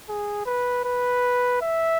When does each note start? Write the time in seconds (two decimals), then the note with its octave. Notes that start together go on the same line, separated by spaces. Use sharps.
0.09 G#4
0.46 B4
0.84 B4
1.61 E5